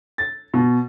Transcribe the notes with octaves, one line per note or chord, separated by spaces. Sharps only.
A6
B2